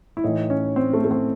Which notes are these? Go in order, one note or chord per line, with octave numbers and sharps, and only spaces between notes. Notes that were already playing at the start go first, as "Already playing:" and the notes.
E4
A2 E3 D#4
C#4
C4
A3
A3
C4